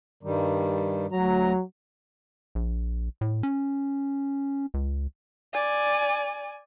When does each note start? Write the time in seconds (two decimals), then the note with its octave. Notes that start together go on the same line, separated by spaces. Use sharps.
0.23 G2 D#3 G3
1.12 D2 F#3 A#5
2.55 A#1
3.21 A2
3.43 C#4
4.74 C#2
5.54 D5 G#5